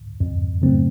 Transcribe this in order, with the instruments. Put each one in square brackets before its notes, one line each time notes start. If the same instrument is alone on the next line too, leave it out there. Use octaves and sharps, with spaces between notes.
[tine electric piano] F2
C#3 F#3 A3 C4